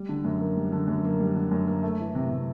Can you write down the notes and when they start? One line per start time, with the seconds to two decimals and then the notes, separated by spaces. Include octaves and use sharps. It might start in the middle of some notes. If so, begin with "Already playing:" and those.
Already playing: G3
0.09 D3
0.25 F#2
0.40 A#3
0.57 G3
0.72 D3
0.88 F#2
1.04 A#3
1.20 G3
1.36 D3
1.51 F#2
1.68 A#3
1.83 A3
2.00 E3
2.15 C3
2.31 C3